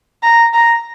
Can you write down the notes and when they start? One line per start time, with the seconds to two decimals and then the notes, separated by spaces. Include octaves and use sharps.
0.23 A#5
0.53 A#5